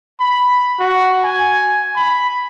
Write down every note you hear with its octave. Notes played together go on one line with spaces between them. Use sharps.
B5
F#4
G#5
B5